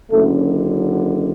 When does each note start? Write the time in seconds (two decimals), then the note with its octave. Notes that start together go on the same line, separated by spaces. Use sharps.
0.11 F#1 F#2 D3 A3